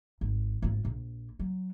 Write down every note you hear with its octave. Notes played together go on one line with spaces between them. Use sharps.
G#1
G#1 F4
A#1
F#3